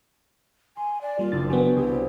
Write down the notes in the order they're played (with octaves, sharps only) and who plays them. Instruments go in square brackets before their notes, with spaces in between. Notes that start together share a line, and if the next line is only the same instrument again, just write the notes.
[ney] G#5 [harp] C6
[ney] D5
[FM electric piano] G3 A#3 [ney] F4
[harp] F#1 D4 E4 [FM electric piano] A6
[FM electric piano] F#3 B3 [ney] F#4 [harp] B4 G5 G#5
[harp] C2 C5 D#6 [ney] G4